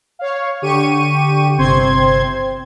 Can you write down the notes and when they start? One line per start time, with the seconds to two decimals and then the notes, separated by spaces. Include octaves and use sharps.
0.19 C#5 F5
0.62 D3 G4 C#6 D#7
1.58 G1 C3 C4 C5 C6 G#6